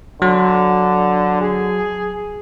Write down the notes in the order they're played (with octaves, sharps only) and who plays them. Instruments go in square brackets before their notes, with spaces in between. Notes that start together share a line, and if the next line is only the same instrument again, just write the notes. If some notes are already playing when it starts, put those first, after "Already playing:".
[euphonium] D3 [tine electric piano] F#3
[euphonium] G#4